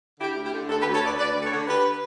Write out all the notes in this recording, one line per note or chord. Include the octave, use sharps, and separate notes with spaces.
D3 E4 G4
D2
E4 G4
D3
D2 F#4 A4
G4 B4
D2
A4 C#5
D2 B4 D5
D2 B4 D5
D2
A4 C#5
D3
D3 G4 B4